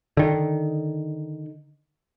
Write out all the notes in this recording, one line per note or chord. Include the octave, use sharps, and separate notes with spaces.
D3 D#3